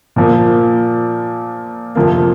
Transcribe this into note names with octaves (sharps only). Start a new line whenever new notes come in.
A#2 F3 A#3
F2 C3 F3 A#3